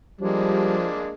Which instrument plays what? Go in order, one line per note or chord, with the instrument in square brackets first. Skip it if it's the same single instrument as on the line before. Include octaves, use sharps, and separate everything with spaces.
[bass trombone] F3 [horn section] G3 [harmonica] G#3 A#3 D4